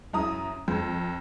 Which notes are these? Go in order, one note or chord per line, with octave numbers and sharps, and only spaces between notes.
F#2 E4 A#5 D#6
F2